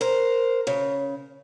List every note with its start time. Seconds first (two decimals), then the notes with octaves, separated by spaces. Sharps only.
0.01 A#4 C5
0.67 C#3